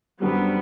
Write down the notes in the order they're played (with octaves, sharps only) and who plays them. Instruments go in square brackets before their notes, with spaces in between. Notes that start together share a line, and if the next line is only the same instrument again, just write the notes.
[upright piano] F#2 D3 F#3 C4 [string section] G3 B3